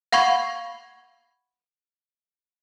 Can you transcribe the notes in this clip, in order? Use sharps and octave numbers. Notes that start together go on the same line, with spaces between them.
F5 F#5 B5 C#6 G#6